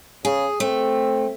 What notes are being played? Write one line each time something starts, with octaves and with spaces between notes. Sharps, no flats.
C#3 G#4
A3 C4